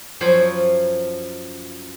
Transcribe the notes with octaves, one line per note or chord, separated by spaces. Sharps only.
F#2 F3 C5 C#5 B5